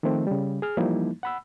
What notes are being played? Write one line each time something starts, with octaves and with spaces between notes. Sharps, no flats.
D#3 F3 A3 C4
C#3 G3
G#4 F6
E3 F3 G3 A#3 D#4 E4
F#5 B5 E6